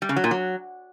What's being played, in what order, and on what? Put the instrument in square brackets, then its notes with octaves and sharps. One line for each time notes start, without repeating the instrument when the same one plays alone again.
[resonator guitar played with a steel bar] G3
C#3
F#3
A#2
F#3